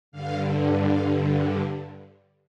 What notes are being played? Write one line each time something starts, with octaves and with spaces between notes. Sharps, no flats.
G2 D3 F5
G2 D3 F5